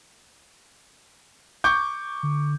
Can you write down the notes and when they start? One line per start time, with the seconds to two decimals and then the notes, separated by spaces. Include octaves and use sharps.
1.64 C#6 D6 G6
2.23 D3